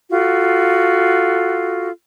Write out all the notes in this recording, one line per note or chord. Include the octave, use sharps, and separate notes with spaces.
F4 F#4 A4